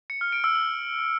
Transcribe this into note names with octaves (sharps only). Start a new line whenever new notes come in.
C#7
F6
D7
E6
F#7